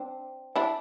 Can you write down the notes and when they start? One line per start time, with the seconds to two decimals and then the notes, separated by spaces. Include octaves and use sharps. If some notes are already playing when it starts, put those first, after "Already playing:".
Already playing: C4 D4
0.56 D4 E4